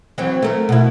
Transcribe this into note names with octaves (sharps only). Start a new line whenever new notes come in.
E3 F#3 C4
A3 A#4
B2 E4